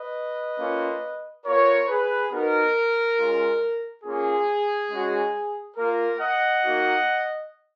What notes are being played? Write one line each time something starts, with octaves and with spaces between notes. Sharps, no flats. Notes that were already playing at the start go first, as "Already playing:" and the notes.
Already playing: B4 D#5
A#3 C#4 F4
B3 F4 A#4 C#5
G#4 B4
B3 D#4 F#4 A#4
G#3 C#4 F4
A#3 C#4 F4 G#4
G#3 C#4 F#4
A#3 F4 A#4
D#5 F#5
A#3 D#4 F#4